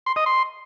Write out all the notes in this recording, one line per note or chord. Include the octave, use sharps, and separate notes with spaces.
C6
D#5
C6